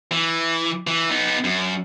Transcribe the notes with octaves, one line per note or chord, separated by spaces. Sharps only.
E3
E3
B3 D#4
F#2